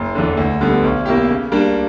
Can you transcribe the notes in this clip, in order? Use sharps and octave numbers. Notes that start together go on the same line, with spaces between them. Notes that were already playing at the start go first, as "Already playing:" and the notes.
Already playing: F#1
E2 D3
D2
D3 G3 B3
B1
B2 A#3 E4 G4
C#3
G3 A#3 D4